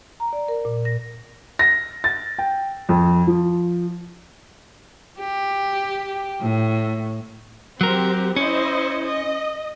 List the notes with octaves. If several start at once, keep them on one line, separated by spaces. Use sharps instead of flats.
A#5
D5
A#4
A#2
A#6
A#6
A6
G5
F2
F3
G4
A2
F#3 C4 G4 A#4
C#4 E4 C5 D#5
D#5